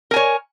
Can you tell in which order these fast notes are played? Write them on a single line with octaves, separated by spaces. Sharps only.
A#4 G#5 C#5